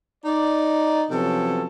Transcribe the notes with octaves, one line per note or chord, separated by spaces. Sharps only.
D#4 D5
C3 F3 F#3 B3 C#4 A4